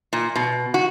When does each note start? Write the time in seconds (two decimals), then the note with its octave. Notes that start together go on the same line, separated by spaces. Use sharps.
0.13 A#2
0.36 B2
0.74 F#4